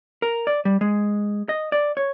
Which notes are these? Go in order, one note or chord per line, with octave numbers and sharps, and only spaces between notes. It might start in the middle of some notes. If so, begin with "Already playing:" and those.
A#4
D5
G3
G#3
D#5
D5
C#5